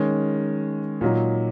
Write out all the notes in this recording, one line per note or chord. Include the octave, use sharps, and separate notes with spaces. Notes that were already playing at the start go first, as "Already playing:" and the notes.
Already playing: D#3 G#3 C#4
A#2 F#3 D#4